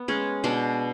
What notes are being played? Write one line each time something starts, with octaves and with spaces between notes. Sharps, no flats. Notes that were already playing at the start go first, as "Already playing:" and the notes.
Already playing: B3
G#3 C#4
B2 D4